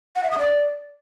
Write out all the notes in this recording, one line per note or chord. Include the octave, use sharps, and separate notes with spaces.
F#5
E5
D#6
D5